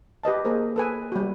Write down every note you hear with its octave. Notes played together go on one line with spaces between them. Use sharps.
G4 B4 D#5 A5
A#3 G#4 A#4 C5
A4 B4 G#5
G3 F#4